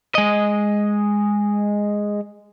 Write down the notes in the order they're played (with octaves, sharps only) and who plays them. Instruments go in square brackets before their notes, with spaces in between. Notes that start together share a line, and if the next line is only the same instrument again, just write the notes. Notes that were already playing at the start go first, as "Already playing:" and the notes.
[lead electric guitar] G#3 D#5